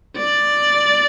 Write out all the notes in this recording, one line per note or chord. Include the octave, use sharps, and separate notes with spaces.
D5